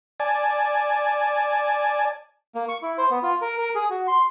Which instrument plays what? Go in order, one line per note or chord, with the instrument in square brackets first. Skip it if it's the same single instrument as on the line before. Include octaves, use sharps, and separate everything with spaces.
[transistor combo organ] D5 G#5 A5
[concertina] A#3
C#6
E4
C5
B3
F4
A#4
A#4
G#4
F#4
C6